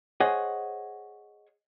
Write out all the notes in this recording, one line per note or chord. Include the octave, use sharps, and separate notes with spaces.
G#4 C5 C#5 D#5 F#5